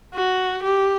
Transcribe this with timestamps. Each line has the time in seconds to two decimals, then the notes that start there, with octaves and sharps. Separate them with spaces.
0.14 F#4
0.63 G4